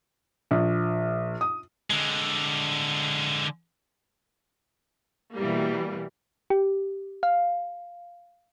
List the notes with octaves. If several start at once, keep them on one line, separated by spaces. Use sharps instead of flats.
A#1
D#6
D3 G#3
B2 E3 G3 A#3
G4
F5